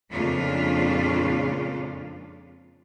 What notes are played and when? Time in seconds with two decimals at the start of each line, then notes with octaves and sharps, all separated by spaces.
0.11 F2 A#2 C#3 G#3 D4 F4